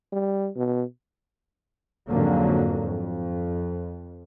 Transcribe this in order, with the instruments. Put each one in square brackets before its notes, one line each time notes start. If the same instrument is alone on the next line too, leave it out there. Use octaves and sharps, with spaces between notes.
[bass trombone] G3
B2
[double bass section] F2 G#2 D3 F#3 A#3
F2